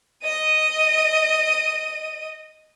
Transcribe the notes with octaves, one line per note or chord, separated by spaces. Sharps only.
D#5 D#7